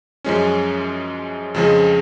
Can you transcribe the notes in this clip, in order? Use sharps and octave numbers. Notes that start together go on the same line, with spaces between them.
F#2 F3 G#3 C#4
F2 C#3 F3 G#3